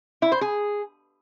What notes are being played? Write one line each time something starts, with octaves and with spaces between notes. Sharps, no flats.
E4
C5
G#4